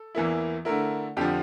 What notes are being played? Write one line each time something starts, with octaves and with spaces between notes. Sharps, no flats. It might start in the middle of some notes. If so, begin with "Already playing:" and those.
Already playing: A4
E2 E3 A#3 E4
D3 A3 E4 A#4
F2 D3 F3 G4